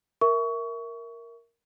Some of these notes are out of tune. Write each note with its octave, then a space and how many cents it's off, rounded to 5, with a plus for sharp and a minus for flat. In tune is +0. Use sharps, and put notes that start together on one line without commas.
A#4 +0 E5 +0 C#6 +25